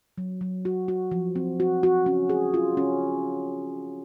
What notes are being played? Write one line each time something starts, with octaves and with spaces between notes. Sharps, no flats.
F#3
F#3
F#4
F#4
F3
C4
F#4
F#4
C#4
G#4
F4
C#4